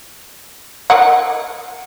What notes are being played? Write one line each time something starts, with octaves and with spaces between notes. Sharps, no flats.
A#4 D#5 F#5